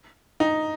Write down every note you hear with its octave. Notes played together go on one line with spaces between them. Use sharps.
D#4